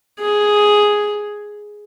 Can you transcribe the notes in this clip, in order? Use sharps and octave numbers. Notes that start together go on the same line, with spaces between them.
G#4